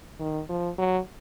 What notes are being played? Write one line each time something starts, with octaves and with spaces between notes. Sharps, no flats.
D#3
F3
F#3